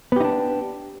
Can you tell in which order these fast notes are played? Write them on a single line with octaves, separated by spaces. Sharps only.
B3 G4 D#4 D4